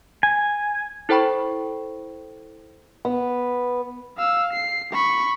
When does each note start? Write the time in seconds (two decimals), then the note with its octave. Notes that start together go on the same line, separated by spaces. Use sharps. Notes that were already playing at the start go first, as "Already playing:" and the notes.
0.23 G#5
1.09 E4 A4 C5 G5 B5 C#6
3.05 B3
4.17 F5 E6
4.53 C7
4.93 B5 C#6